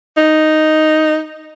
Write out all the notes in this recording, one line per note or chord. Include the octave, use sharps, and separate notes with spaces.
D#4